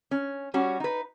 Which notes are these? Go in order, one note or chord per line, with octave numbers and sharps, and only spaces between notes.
C#4
G3 C#4 F#4
D#4 B4